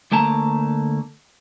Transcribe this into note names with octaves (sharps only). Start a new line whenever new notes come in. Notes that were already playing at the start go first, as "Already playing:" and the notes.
D2 A3 A#3 A5 A#5